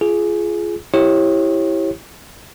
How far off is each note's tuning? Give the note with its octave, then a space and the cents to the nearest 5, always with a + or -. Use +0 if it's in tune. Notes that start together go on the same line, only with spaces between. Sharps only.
F4 -20 G#4 +15
E4 +0 G4 +0 C#5 -35